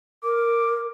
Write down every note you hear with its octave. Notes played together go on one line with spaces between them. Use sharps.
A#4 D6